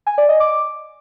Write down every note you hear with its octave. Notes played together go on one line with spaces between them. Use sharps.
G#5
D5
D#5
D6